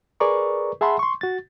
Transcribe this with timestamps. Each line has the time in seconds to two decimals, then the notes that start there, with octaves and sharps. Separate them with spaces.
0.20 G#4 A#4 B4 D5 A#5 C#6
0.81 G#4 E5 F#5 A5 B5 C6
0.99 C6 C#6
1.21 F#4 A6